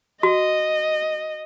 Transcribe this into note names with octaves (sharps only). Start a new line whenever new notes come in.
F#4 D#5